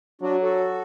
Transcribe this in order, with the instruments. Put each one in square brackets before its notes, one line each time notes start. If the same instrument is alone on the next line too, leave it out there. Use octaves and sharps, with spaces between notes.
[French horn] F#3 [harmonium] D4 F#4
[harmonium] F#4 A4